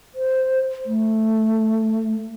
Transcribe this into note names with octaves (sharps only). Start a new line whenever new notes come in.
C5
A3